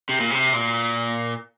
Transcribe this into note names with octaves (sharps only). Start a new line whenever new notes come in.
C3
A#2
C3
A#2